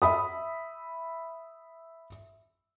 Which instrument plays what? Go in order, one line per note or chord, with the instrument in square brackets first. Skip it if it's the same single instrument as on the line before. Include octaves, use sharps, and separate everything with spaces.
[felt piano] E5 B5 D#6